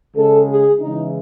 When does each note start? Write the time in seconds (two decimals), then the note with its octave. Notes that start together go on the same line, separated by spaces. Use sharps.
0.16 C#3 G#3 A4
0.49 G#4
0.80 C#3 E3 G#3 D#4